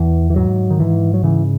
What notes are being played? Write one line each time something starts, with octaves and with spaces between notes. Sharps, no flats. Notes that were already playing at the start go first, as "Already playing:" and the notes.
Already playing: E2 E3
E3
G#2 F#3
D#3
G#2 E3
F#3
C#3 E3